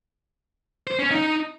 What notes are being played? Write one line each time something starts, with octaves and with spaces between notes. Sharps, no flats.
C5
C#4
D#4